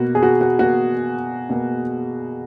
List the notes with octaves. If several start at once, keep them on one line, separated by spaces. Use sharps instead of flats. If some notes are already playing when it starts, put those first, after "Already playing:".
Already playing: B2 A#3 F#4
G#4
F#4
F#4
B2 A#3 F#4
B2 A#3